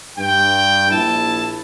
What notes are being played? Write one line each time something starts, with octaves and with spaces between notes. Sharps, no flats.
G2 G5
A#1 E4 A5